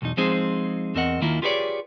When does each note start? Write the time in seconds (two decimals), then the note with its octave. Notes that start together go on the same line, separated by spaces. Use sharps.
0.02 B1 E2 D#4
0.17 F3 G#3 C4 D#4 G#4 C5
0.95 E2 C4 A#4 D#5 F#5
1.21 D#2 D#3 A#3 E4 F4
1.42 F4 G4 G#4 B4 C#5 D5